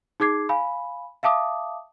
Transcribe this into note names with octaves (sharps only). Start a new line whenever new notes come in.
D#4 G#4 D6 G#6 C7
F5 G#5 B5
E5 F5 A5 D6 D#6